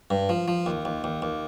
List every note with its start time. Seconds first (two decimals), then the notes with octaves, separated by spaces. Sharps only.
0.10 G2
0.29 F3
0.48 F3
0.66 D#2
0.85 D#2
1.04 D#2
1.22 D#2